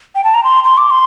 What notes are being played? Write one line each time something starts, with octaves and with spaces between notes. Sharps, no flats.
G5
A5
A#5
C6
C6
D6
C6